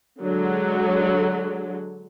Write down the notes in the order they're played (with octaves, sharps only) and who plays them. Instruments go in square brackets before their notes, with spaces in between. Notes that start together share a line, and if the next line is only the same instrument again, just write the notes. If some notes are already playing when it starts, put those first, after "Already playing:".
[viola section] D3 F#3 G#3